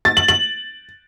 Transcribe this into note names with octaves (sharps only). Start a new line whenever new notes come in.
A6
F#7
F#7